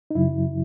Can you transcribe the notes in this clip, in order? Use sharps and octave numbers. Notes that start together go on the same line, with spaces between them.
D#4
F#2 C#3 F#3 E4